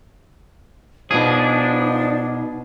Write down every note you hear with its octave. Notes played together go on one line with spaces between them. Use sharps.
B2 F3 D4 D#4 G#4